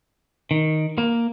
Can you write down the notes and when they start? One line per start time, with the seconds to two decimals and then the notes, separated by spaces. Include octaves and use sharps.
0.51 D#3
0.98 A#3